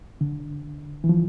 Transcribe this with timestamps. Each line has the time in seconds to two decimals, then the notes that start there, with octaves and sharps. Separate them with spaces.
0.21 D3
1.04 E3
1.09 F3